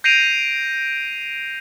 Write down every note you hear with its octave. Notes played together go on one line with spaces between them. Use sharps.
G6 A#6 C7 D7 D#7 F7